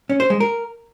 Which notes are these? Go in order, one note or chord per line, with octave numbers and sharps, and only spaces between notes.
C#4
C5
G#3
A#4